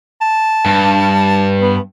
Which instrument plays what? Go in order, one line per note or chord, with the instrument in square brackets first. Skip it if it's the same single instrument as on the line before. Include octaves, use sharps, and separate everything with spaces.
[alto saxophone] A5
[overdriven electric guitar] G2
[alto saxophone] B3